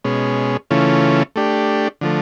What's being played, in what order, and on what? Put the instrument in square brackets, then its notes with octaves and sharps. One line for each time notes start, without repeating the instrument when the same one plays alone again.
[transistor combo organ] B2 G#3 C#4
C#3 E3 A3 C#4 F4
A3 D4 G4
D3 F3 A3